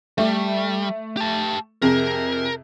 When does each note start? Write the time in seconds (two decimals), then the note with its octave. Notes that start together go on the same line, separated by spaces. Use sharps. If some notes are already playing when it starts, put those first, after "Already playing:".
0.18 G3 A3
1.17 G4 A5
1.82 F2 C3 G#4 A#4